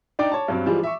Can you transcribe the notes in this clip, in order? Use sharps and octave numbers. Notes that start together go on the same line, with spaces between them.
D4 D#4 D5 G5 D6
C#5 A5
G2 F#3 C4
E3 F3 G3 G#3
E5 C#6